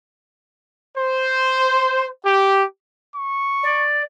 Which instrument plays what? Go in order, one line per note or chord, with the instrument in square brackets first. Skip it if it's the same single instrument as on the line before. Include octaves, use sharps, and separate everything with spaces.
[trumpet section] C5
G4
[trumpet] C#6
[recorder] D5